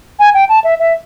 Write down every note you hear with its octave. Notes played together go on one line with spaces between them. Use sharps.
G#5
G5
A5
E5
E5